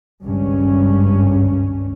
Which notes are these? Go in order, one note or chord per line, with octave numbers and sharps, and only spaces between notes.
G#1 C#2 G2 C#4